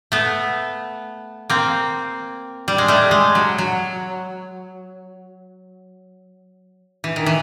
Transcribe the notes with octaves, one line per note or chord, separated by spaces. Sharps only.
A3 B3
A#3 C4
G3
G#3
G3 A3
G#3
F#3
F#3
E3
D#3
E3